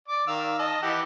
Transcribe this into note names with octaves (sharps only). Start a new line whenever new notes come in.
D5 D6
D#3 F5 E6
D#5 A5
E3 G4 F#5